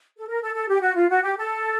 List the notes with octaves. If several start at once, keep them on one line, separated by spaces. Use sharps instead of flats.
A4
A#4
A4
A4
G4
F#4
F4
F#4
G4
A4